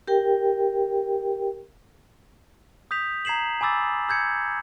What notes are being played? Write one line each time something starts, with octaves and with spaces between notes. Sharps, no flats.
G4 A#4 G5
D#6 G6 B6 F7
A#5 G#6 C7 E7 F#7
G#5 B5 D6 E6 A6
E6 G6 G#6 C#7